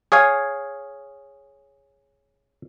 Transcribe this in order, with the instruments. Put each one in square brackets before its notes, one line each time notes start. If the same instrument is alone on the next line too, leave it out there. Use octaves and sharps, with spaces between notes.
[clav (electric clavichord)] G#4 C#5 F5 G#5